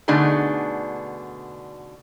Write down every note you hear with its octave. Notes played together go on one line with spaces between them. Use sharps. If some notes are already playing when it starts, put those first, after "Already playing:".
B2 D3 A3 D4 D#4 G#4